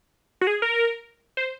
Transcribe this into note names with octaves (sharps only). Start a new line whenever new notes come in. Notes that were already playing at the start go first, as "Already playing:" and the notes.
F#4
G#4
A#4
C5